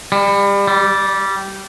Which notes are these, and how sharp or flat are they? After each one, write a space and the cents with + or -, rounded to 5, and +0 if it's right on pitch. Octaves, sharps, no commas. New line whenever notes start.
G3 +30
G3 -15